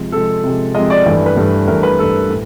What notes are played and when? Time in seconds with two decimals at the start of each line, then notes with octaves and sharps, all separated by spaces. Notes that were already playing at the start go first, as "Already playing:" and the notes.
Already playing: C3 F3 G#3
0.12 C3 F3 G#3 A4
0.44 C3 F3 G#3
0.75 C3 F3 G#3 D#5
0.90 D5
1.06 G2 E3 A3 D5
1.26 B4
1.37 G2 E3 A3
1.68 G2 E3 A3 A#4
1.83 B4
1.99 G2 E3 A3 A4
2.29 A2